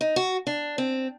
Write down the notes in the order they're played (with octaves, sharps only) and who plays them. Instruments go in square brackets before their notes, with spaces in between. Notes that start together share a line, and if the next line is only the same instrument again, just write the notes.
[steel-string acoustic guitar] D#4
F#4
D4
C4